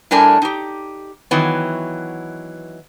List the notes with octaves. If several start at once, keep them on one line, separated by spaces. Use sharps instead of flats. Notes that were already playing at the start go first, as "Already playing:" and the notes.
A2 G3 A3 D4 A#4 G#5
D#4 G4
D#3 E3 F#3 B3